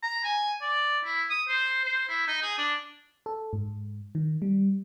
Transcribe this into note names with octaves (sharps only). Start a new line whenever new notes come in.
A#5
G#5
D5
E4
D#6
C5
C5
E4
D#4
G#4
D4
A4
G#2
D#3
G3